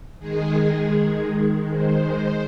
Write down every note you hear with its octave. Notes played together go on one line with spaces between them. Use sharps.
D#3 G#3 G#4
C5